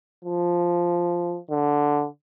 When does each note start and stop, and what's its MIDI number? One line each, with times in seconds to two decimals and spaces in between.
0.25 1.38 53
1.51 2.07 50